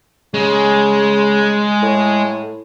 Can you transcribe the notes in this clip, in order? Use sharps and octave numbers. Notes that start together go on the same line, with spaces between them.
C#3 G#3
A2